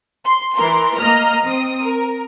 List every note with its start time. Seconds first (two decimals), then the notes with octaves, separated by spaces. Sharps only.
0.25 C6
0.55 E3 A#4 C6
0.98 A#3 D#5 A#5 F6
1.45 C4 D#6
1.82 A#4